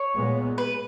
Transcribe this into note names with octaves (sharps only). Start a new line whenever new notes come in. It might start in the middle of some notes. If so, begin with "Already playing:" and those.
Already playing: C#5
A#2 G#3 B3
B4